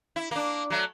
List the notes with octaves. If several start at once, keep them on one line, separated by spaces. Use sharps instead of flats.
E4
A#3 D4
F#3 A3